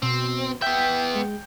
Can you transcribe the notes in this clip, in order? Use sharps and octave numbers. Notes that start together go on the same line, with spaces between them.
B2 C4
B3 E5 G5 B6
G#3